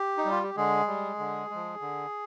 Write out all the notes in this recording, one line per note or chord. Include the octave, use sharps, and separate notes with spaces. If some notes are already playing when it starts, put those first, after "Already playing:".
Already playing: G4
D#4
G3
F4
G4
D3 G#3 G#4
G3
D3
F3 G#3
D3